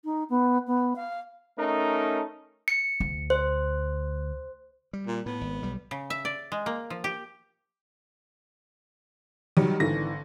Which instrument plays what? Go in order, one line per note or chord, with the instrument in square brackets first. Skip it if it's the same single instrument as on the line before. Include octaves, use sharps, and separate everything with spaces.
[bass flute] D#4
B3
B3
F5
[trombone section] A3 C#4 D#4 A4 A#4
[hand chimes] C#7
[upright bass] D2
[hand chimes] C5
[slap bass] G3
[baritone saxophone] A#2
[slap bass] A2 [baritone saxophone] B3
[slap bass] G#1
B1 G3
[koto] C#3
E5
D5
G#3
A#3
F3
G4
[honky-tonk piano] D#3 F#3 [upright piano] G3
[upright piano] G#1 E3 D4 [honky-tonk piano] D3 A#6